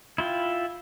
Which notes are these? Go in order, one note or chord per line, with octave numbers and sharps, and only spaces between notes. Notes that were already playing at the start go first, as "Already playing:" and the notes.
E4 F4 G5